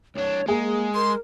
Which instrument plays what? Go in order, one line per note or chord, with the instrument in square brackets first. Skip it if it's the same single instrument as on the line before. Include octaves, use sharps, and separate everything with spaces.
[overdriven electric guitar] C2 D4 [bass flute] C#5
[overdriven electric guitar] G#3 [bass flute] A#3 [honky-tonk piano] G#4
[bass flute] A#4 [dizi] C6